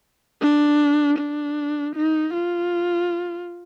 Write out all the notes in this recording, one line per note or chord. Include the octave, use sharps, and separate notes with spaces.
D4
D4
D#4
F4